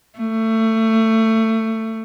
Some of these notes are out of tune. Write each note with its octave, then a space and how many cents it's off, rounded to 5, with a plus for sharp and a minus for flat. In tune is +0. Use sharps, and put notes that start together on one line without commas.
A3 +20